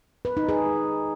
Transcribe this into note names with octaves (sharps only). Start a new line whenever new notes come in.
B4
D#4
G#4